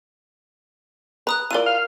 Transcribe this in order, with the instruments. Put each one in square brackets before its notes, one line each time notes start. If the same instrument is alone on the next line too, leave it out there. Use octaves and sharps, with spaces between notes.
[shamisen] B4 [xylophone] A#5 D#6 F#6
[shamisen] E4 F4 D5 [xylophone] A#4 D#7
[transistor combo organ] F5